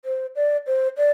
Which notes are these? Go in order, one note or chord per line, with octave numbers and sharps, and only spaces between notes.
C5
D5
C5
D5